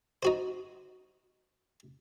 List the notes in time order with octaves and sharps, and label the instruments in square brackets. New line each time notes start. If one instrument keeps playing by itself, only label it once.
[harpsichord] D#4 F#4 C5